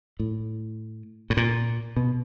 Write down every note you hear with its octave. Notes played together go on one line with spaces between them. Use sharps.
A2
A2
A#2
B2